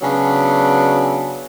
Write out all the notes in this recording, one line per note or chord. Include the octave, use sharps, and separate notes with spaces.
C#3 F#3 B3 D4